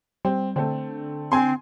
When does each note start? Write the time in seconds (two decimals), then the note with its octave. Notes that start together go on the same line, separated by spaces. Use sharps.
0.25 G3 C4
0.56 D3 A3 C4
1.32 C4 G#5 C6